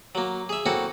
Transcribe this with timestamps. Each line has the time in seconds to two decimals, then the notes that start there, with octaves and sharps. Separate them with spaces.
0.15 F#3 A#3
0.49 G#4 E5
0.66 A#3 C4 C#4 E4 F#4 A4